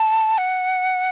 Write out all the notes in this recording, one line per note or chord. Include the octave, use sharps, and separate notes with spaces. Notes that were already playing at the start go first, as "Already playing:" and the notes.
Already playing: A5
F#5